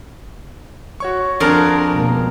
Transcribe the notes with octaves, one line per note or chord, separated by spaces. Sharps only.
F#4 C#5 C#6
F2 D4 G#4 A#4 F6
C#2 B2 A#3